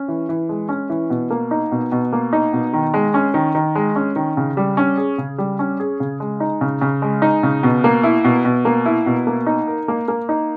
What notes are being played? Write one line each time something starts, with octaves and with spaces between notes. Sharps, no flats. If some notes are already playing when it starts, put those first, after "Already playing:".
Already playing: C#4
E3
E3
G#3
C#4
E3
B2
A#3
D#4
B2
B2
A#3
D#4
B2
D#3
G#3
C#4
D#3
D#3
G#3
C#4
D#3
C#3
G3
C#4
G#4
C#3
G3
C#4
G#4
C#3
G#3
D#4
C#3
C#3
G#3
D#4
C#3
B2
A#3
E4
B2
B2
A#3
E4
B2
A#3
D#4
A#4
A#3
A#3
D#4